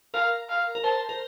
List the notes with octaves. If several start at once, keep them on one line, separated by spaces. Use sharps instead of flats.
A#4 F5
F5
A#4
C5 A5
A#4